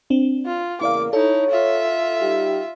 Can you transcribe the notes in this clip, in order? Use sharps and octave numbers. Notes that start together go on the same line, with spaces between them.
C4 D4
F4
E2 C#3 A#3 E4 D5 F5 D6
D#4 E4 A4 C#5
F4 E5
G3 D#4 G4